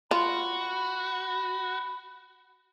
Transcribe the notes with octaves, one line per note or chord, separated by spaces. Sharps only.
F4 F#4 B5